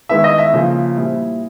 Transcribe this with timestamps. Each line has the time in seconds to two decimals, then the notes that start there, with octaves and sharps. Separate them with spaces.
0.09 D#3 G#3 B3 E4 E5
0.24 D#5
0.39 E5
0.53 C#3 F3 A#3
0.96 A#2 G3 C4 E4